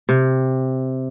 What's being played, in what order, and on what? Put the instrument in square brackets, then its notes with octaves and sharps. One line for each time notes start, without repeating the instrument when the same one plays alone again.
[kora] C3